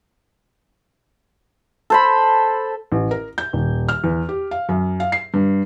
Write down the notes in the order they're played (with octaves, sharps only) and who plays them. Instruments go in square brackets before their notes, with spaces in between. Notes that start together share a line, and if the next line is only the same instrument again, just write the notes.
[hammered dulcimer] A4 C5 B5
[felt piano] A1
A#4
G6
D#1
F6
E2
G4
F5
F#2
F5
C7
G2